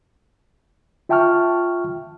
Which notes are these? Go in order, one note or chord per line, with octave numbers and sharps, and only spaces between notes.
F4 E5 G5 A5 C#6 F6